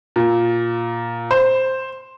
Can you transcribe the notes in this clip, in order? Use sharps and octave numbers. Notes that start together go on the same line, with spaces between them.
A#2
C5